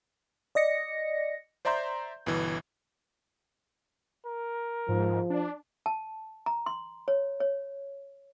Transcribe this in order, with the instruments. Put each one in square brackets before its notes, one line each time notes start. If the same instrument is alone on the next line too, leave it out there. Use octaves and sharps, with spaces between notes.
[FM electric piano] D5 D#5 A#6 C#7
[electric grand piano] C5 D5 E5 A#5 C6 G6
G1 B2 E3
[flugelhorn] A#4
[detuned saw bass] G#2 [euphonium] F3
[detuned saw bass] D4
[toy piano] A5
A#5
C6
C#5
C#5